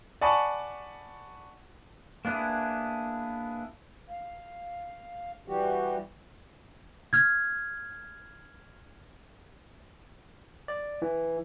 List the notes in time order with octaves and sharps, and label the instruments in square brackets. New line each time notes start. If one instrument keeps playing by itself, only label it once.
[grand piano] D5 F#5 G#5 A5 B5 C#6
[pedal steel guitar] A#3 B3 D4 E4 G#4
[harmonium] F5
E3 G3 F#4 G4
[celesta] F6 G#6
[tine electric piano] D5
E3